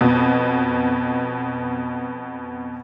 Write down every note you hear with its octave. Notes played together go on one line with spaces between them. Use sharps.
F2 B2